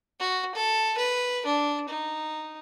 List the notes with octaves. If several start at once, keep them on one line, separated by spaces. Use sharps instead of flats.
F#4
A4
B4
D4
D#4